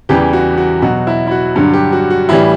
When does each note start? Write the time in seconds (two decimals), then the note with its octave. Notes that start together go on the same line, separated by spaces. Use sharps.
0.09 E2 C#3 E3 G3 G4
0.33 F#4
0.58 F#4
0.82 B2 F#3 F#4
1.07 E4
1.27 E4
1.31 F#4
1.56 G2 D3 F#3
1.73 G4
1.92 F#4
2.10 F#4
2.29 A2 E3 G3 E4